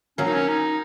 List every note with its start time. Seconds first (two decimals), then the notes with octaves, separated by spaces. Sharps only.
0.18 F#3 A#3 C#4
0.26 D#4
0.34 C#4
0.48 D#4